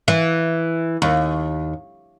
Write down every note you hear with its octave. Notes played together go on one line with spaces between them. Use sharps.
E3
D#2